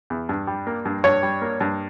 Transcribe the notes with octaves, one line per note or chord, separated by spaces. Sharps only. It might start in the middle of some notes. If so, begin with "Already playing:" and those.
E2
G2
G3
A#3
G2
G2 C#5
G3
A#3
G2